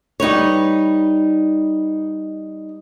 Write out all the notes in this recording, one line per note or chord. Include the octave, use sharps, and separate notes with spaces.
G3 D#4 B4 C#5